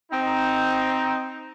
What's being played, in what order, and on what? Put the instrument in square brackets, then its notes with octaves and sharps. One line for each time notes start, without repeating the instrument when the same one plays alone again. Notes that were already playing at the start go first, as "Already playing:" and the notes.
[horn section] C4 D#4